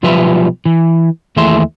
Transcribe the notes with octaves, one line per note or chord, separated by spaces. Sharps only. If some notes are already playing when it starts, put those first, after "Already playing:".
B1 F3 G3 F4 B4 E5
E3
D#2 E3 A3 G#4 E5 C6